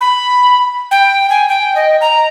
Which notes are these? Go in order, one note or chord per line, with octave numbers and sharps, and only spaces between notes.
B5
G5
G#5
G5
D#5
A#5